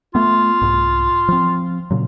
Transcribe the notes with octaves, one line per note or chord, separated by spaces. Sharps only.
A3 B3 F4
C2 G#2
F3 C4
A#2 C#3 F#3